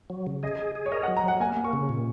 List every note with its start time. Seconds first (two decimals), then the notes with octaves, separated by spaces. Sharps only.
0.10 F#3
0.27 C#3
0.43 G#4 D#5
0.59 G#4
0.75 G#4
0.86 C#5
0.92 A#4 D#5
1.03 F#5
1.08 F#3
1.17 A#5
1.24 F#3 F#5
1.40 A#3 G#5
1.57 A#3
1.64 C#6
1.73 C#3
1.89 A#2